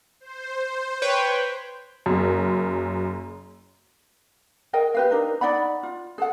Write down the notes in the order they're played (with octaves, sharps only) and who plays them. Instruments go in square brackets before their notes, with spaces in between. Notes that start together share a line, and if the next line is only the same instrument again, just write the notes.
[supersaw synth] C5
[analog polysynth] B4 C#5 G5
[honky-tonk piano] F#1 F#2
[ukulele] G#4 A#4 D#5 G5
G4 B4 F5
D4 D#4 A#4
D#4 D5 F#5 B5
F4
G#4 A4 F#5